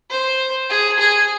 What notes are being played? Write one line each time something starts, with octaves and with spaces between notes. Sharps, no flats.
C5
G#4
G#4